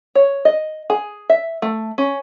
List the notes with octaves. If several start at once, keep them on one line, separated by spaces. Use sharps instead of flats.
C#5
D#5
G#4
E5
A3
C#4